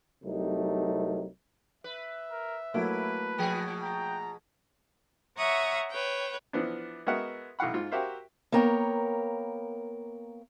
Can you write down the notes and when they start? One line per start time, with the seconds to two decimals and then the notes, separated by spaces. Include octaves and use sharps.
0.24 C2 C3 F#3 A3 D#4 A#4
1.84 B4 E5
2.31 A#4
2.74 F#3 A3 A#3 E4 B4
3.38 B2 F3 G#4
3.83 G5 A#5
5.37 C#5 E5 F#5 A#5 C#6 D#6
5.90 B4 C#5 G5
6.53 E3 F3 B3 D4
7.07 G#3 B3 F#4 A#4 E5 F#5
7.59 B1 E3 F5 F#5 B5
7.74 G#2 F4
7.92 F#4 G4 A#4 C5 E5 F5
8.52 A#3 B3 A#4 C#5 G5